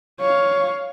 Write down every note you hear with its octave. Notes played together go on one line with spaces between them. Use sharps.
C#5 F5